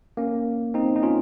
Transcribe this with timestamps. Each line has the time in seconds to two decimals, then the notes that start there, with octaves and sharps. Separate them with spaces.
0.17 A#3 C#4
0.74 C4 D#4
0.96 D#4
1.03 C#4 F4